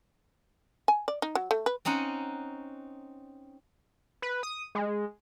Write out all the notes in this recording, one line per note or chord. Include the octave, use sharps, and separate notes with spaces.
G#5
D5
D#4
F#3
A3
B4
C4 C#4 D#4 F#5
B4
D#6
G#3